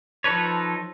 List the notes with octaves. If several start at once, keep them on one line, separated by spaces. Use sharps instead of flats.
F3 D#4 A4 B4 C#5